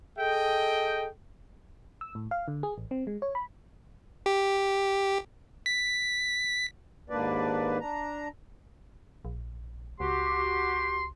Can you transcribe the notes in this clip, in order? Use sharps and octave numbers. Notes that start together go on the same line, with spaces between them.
G#4 A4 D#5 G5
E6
A2
F5
D3
G#4
A1
C4
G#3
C#5
B5
G4
B6
D#2 G#2 A#3 D4 B4 D5
D4 A#5
A#1
C#2 F#4 G4 C6